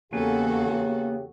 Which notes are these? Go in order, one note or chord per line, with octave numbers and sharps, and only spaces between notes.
E2 C#3 A#3 B3 F#4 G4 A4 G#5